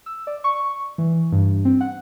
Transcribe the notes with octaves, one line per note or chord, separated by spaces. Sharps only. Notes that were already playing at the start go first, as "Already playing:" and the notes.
E6
D5
C#6
E3
G2
C4
F#5